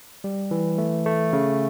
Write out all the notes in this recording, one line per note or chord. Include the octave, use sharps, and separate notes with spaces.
G3
E3
A3
A3
C#3